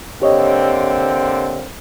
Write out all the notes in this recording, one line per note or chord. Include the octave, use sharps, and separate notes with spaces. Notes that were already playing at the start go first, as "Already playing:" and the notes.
D3 A#3 C4 G4 C#5 D#5